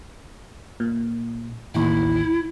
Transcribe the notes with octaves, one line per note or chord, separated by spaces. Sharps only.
A#2
A1 D#2 E4